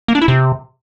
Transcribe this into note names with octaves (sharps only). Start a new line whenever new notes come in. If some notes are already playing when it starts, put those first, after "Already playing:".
A#3
D4
E4
C3